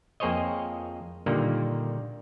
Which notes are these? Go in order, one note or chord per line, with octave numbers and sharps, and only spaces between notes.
F2 A#3 G#4 C5 C#5 D#5
A#2 D3 D#3 G3 A#3